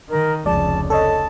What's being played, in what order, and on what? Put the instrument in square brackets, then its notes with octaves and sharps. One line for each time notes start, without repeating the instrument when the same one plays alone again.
[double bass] D#3 [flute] A#4
[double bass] F1 C#2 [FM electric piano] F3 G#3 D5 [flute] A5
[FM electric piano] A4 C#5 D#5 [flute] A5